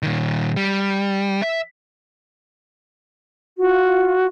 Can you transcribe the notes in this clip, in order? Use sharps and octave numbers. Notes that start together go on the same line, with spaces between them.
A#2 D#3
G3
E5
F4 F#4